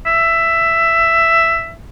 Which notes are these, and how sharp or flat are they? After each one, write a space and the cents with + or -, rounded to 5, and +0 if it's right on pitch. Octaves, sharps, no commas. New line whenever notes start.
E5 +10